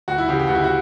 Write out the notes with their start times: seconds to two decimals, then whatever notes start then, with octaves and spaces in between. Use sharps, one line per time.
0.08 D2 F#4
0.18 E4
0.28 C#3 E3 G4
0.39 G4
0.47 D2 F#4
0.55 E4
0.64 F#4